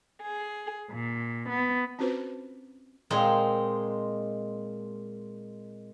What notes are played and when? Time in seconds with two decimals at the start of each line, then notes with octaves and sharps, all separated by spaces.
0.21 G#4
0.91 A#2
1.49 B3
1.99 C4 C#4 F4 F#4 B4 C5
3.10 A#2 G#3 C4 D#4